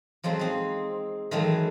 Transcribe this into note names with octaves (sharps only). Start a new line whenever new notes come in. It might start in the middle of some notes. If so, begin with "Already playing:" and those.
F3 F#3 G#3 C4
C4 D#4
D#3 E3 F#3 G#3 A3